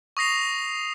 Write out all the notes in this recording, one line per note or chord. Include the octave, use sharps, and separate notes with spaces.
C#6 D#6 A#6 C7 F7